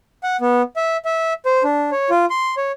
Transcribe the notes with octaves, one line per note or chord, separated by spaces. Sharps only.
F#5
B3
E5
E5
C5
D4
C#5
F4
C6
C#5